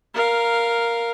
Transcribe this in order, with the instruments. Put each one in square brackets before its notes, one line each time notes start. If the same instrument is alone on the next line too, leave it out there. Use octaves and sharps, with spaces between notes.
[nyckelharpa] A#4 F5